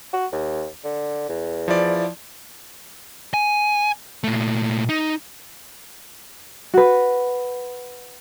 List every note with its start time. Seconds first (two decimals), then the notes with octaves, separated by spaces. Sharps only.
0.13 F#4
0.32 D#2
0.84 D3
1.29 E2
1.68 F3 E4 D5
3.34 G#5
4.24 A#2 A3
4.89 D#4
6.74 F#4 B4